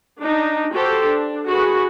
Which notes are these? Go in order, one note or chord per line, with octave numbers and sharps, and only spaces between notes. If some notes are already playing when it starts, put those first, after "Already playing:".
D4 D#4
F#4 G4 A4 C5
D4
F#4 G#4 B4